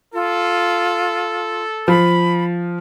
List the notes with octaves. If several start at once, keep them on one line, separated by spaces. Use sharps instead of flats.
F4 A4
F3 B5